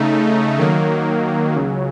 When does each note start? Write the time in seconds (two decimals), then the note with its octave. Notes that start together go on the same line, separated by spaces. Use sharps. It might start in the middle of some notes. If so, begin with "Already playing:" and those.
Already playing: C#3 A3 D#4
0.59 D#3 F#3 A#3
1.55 C#2 C#3 F#3